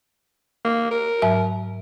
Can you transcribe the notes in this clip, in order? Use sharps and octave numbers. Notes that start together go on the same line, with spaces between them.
A#3
A#4
G#2 F#3 E5